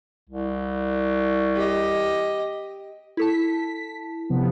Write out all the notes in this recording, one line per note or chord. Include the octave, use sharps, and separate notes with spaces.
C2
G4 D#5
E4 A4 A5 B6
C3 F3 B3